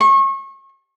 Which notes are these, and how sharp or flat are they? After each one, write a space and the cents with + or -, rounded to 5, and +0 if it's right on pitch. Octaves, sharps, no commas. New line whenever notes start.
C#6 -35